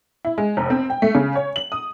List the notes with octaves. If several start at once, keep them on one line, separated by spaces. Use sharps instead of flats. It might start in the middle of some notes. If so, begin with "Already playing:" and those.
E4
G#3
F1
C4
G5
A3
C#3
C#5
F#7
D#6